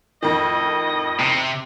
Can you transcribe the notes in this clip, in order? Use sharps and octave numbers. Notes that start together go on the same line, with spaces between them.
F2 A2 D#3 D#5
C3